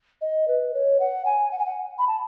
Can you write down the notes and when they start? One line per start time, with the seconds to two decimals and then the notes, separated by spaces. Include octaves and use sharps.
0.21 D#5
0.48 B4
0.74 C#5
1.00 F#5
1.25 G#5
1.51 F#5
1.59 G#5
1.66 F#5
1.99 B5
2.08 A5